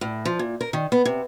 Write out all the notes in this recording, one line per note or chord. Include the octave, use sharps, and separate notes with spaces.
A2
F3
A#2
A#4
D#3
B3
C3